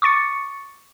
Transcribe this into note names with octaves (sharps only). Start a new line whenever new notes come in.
C#6 D6 A6 C#7